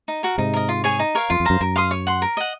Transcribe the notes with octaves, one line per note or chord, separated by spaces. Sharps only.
D#4
F#4 A#4
G#2 C3 D#4
A#4 D#5
F4
G#4 C#5 G#5
D#4
A#4 C#5 F5
F2 F4
F2
F#2 C5 F5 A#5
F#2 A#4
F5 C6 D#6
C#5
F#5 C6
A#4
D#5 F#5